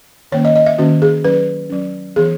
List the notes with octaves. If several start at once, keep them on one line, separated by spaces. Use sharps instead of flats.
D#3 A#3 C#4 C#5
D#5
D#5
E5
D#3 A#3 C#4 F#4
G#4
F#3 C#4 B4
F#3 C#4
E3 B3 G#4